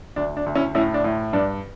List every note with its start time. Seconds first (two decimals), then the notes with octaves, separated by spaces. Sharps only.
0.16 D2 D4
0.37 D4
0.46 D2
0.55 C#4 E4
0.75 A2 C#4 E4
0.94 D4
1.04 A2
1.33 G2 D4